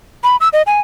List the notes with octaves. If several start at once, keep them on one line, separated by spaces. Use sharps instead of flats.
B5
E6
D#5
G#5